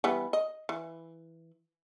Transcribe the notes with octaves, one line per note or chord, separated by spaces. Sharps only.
E3 G3 B3
D#5
E3